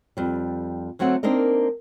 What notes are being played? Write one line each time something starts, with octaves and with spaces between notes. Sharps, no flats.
F2 G3
D2 F#3 A3 C4 F#5
A#3 C4 D4 D#4 A#4 D#5